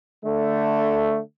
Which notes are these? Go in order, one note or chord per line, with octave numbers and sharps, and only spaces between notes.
D3 A3